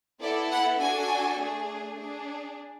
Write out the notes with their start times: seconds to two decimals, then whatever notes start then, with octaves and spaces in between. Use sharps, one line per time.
0.21 B3 E4 A4 D5
0.51 F#5
0.80 D4 F#4 A4 G#5
1.38 A3 D4 G#4
1.97 D4 G#4